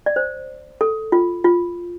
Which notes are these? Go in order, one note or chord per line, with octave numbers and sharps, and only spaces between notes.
D5
C5
A4
F4
F4